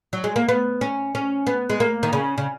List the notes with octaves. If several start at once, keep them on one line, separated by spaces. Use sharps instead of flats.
F#3
G#3
A#3
B3
C#4
C#4
B3
G#3
A#3
D#3
C#3
C#3